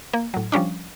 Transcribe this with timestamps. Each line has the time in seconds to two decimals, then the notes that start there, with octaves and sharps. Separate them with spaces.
0.13 A#3
0.34 A2 F#3
0.52 F3 G3 C#4 D4